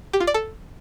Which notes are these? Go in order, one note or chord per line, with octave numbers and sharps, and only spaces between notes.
G4
F4
D5
A4